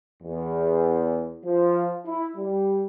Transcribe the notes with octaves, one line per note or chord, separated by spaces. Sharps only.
E2
F3
E4
G3